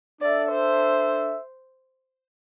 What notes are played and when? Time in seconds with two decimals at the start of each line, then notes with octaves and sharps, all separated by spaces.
0.21 D4 A4 D5 E5
0.51 C5